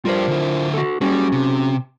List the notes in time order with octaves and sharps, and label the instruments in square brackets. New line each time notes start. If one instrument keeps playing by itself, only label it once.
[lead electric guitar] G3 D4 [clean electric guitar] F4 A#4 C5
[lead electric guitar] D3 E4
[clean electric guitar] F#4 A4
[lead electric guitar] G3 [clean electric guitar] C#4 F#4 G#4
[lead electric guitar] C3